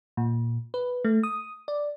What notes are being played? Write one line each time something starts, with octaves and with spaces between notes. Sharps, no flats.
A#2
B4
A3
D#6
D5